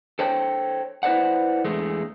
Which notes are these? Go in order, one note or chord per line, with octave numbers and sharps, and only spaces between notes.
A4 C5 C#5 G5
E4 B4 C5 D5 F#5
E2 G#3 A3